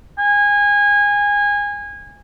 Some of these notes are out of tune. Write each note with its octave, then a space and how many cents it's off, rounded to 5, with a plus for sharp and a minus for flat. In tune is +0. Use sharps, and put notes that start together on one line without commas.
G#5 -25